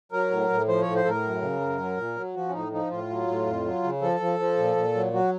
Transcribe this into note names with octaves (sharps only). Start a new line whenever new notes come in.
F#3 A#4
A2
A2
F3 C5
A2 C#5
C5
A2 A4 A#4
F#2
C#3
F#2
F#3
A#2
F#3
F3 F#4
C#4
A2 D#4
F3 D#4
A2 F4
F#3
A2
F2
F#3
C#3
F3 A4
F3
F3
A#2
A#2
F#3
F#3 F#4